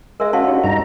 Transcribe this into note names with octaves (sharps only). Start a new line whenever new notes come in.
G#3 A#4 E5
C#4 F#4 F5 A5 C6
C#4 D#4 G4
G2 D#4 A#5